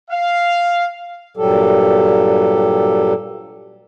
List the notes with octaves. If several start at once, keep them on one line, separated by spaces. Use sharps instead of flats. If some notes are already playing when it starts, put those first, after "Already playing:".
F5
G2 A#2 F#3 G3 G4 A4